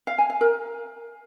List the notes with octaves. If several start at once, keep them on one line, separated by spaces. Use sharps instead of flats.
F5
G#5
F5
A#4